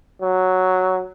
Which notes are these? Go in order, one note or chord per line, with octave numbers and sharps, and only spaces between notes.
F#3